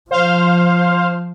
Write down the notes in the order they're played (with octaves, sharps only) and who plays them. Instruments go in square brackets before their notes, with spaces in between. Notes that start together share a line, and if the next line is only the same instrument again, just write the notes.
[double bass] F3 [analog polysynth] C5 F5